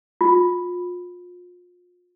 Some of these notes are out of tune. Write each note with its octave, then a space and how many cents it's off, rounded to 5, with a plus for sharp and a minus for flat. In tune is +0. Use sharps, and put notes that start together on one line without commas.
F4 +35